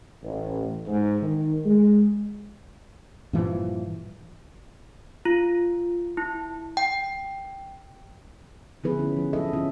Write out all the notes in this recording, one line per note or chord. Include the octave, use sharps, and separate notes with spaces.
A1
G#2
D#3
G#3
G2 A#2 E3 F3
F4
E4
G5
D3 F3 B3 E4 G#4 B4
C#4
F3
F#3 D4 A4 D#5 E5
D3 F3 C4 C#4 F4